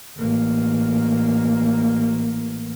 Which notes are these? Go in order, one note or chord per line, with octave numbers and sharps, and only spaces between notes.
A1 A#3